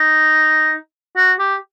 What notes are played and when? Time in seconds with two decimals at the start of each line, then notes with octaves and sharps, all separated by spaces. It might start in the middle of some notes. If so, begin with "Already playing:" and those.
Already playing: D#4
1.16 F#4
1.39 G4